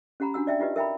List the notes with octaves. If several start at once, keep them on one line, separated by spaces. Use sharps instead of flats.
C#4 G4 F#5 A#5 B5
D4 F#4 F#5 E6
D5 E5 G5
D#4 F4 G4 B4 D#5
A#4 E5 G5 A#5 B5